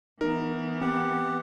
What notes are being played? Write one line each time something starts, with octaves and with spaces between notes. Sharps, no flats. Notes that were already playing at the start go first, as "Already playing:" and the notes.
E3 B3 D#4 A#4
C4 G4 F#5